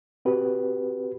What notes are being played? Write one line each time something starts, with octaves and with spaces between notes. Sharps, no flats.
C4 F#4 G4 B4